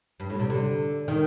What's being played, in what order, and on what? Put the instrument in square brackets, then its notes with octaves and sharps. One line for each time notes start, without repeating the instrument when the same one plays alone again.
[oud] G2
A2
C3
D3
D#3